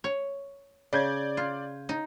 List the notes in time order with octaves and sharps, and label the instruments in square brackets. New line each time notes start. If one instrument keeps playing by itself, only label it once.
[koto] C#5
[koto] C#3 [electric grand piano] D5 G6 G#6
[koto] F4
D#4